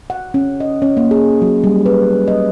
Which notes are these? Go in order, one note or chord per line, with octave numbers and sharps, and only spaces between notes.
F#5
C#4
D#5
C#4
A#3
G#4
F#3
G3
B4
D#5